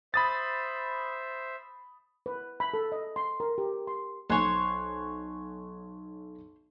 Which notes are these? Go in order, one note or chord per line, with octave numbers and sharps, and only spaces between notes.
C5 E5 B5 D#6 A6
B4
B5
A4
D#5
C6
A#4
G4
C6
B1 C5 C#5 G#5 F#6